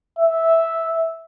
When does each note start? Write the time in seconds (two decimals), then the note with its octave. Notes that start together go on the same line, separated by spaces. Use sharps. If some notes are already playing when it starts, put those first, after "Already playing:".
0.19 E5